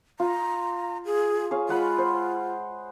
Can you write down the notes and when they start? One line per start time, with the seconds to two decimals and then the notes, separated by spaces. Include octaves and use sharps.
0.20 F4 A#5
1.06 G#4
1.51 G#4 C#5 F5
1.69 G#3 F4 F#5 B5
1.98 C5